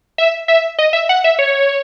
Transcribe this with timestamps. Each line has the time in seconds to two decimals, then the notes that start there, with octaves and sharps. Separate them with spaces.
0.18 E5
0.48 E5
0.78 D#5
0.93 E5
1.09 F#5
1.24 E5
1.39 C#5